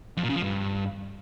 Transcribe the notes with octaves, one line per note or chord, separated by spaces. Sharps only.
F2
A#2
C#3
F3
G2